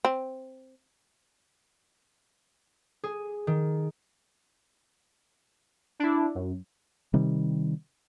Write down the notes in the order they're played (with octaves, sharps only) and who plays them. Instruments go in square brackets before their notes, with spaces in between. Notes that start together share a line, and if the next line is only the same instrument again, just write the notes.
[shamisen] C4
[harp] G#4
D#3
[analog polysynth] D4 E4
F#2
[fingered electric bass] C3 D#3 G3